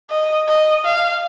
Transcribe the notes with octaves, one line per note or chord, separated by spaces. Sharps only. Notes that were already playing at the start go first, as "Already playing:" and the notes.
D#5
D#5
F5